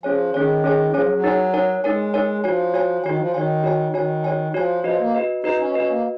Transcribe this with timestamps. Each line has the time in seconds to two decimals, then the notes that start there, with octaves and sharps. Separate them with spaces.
0.03 F3 C#4 G#4 C#5 G#5
0.33 D#3 C#4 G#4 C#5 G#5
0.64 C#4 G#4 C#5 G#5
0.93 F3 C#4 G#4 C#5 G#5
1.03 F#3
1.13 F#3
1.24 D#4 A#4 C#5 G#5
1.54 D#4 A#4 C#5 G#5
1.84 G#3 D#4 A#4 C#5 G#5
2.14 D#4 A#4 C#5 G#5
2.44 F3 F#4 C#5 G#5
2.74 F#4 C#5 G#5
3.04 D#3 F#4 C#5 G#5
3.19 F3
3.34 D#3 F#4 C#5 G#5
3.64 F#4 C#5 G#5
3.94 D#3 F#4 C#5 G#5
4.24 F#4 C#5 G#5
4.54 F3 F#4 C#5 G#5
4.84 F3 F#4 B4 D#5
4.99 A#3
5.14 F#4 B4 D#5
5.44 D#4 F#4 B4 D#5
5.60 C#4
5.74 C#4 F#4 B4 D#5
5.89 A#3